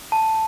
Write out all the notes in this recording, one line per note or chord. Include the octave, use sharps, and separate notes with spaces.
A5